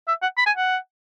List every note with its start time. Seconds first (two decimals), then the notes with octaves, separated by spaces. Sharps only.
0.08 E5
0.22 F#5
0.38 B5
0.47 G#5
0.56 F#5